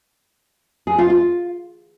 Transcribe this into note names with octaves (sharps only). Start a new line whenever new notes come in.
G#4
F4
F4